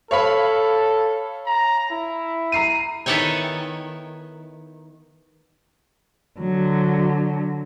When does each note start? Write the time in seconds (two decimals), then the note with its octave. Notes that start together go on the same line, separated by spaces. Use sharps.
0.11 A4 C#5 F5 B5
1.46 A#5
1.90 E4
2.52 A#5 C7 D#7
3.06 D#3 B3 E4 A4 C#5 G#5
6.40 D3 F#3